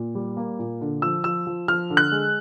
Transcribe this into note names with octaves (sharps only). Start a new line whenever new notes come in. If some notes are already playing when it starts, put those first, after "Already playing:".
Already playing: A#2
G3
A#3
A#2
D3
F3 E6
F3 E6
F3
F3 F6
D3
F#6
G#3